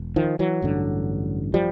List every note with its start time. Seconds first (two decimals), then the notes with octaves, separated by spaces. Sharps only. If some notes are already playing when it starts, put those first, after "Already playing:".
Already playing: E1
0.16 D#3 F3
0.39 E3 F#3
0.62 A1 G2 D3
1.54 F3 G3